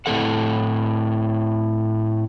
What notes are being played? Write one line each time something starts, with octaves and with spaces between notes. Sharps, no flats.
A2 C4 A4 F#5